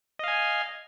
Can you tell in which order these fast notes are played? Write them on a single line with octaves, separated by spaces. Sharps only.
D#5 F5 G#5